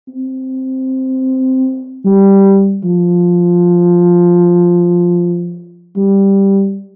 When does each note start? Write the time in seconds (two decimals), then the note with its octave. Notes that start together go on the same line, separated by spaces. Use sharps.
0.08 C4
2.05 G3
2.84 F3
5.96 G3